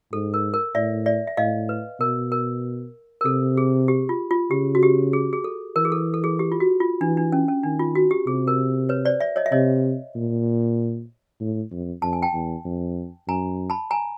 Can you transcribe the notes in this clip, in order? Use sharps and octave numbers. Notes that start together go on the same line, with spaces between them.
G#2 A4
A#4
A#4
A2 D5 E5
D5 E5
E5
A2 D#5 F5
B4
B2 A#4
A#4
A#4
C3 A4
G#4
G4
F4
F4
C#3 G4
F#4
G4
G#4
G#4
A4
E3 A#4
G#4
A4
A4
G#4
G4
F4
F#4
F4
E3 D4
D4
C#4
C#4
D#3 D4
F4
F#4
G4
C3 G#4
A#4
B4 C#5
C5 D5
D5 E5
C#5 D#5
E5
C3 C#5 D#5
A#2
A2
F2
F2 A5
G#5
G5 A5
E2
F2
F#2 G#5 A#5
A5 B5
G#5 A#5